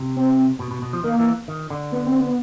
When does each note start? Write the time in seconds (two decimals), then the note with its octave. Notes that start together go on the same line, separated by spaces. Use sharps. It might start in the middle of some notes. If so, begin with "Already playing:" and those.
Already playing: C3
0.16 C4
0.60 B2
0.71 B2
0.82 B2
0.93 F3
1.03 D#3 A#3
1.19 E3
1.48 D#3
1.70 D3
1.92 B3
2.06 C4
2.20 B3